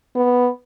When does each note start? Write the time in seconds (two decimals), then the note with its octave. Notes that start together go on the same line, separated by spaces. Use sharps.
0.15 B3